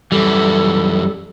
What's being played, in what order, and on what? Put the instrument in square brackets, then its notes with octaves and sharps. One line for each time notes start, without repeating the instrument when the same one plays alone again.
[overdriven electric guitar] F#2 E3 [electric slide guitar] G3 [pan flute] A4